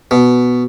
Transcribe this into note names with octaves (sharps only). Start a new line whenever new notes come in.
B2